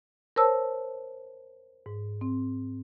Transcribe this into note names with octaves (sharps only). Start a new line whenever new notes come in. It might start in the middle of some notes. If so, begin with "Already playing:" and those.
A#4 C5 C#5 A5 E6
G#2
C4